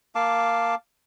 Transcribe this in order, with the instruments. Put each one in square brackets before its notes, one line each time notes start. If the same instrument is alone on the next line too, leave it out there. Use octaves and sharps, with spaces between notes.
[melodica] A#3 F5 A5 D6